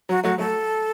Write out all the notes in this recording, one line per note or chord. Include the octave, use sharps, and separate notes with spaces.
F#3 F#4
F#3 A3 F#4
F#3 A3 A4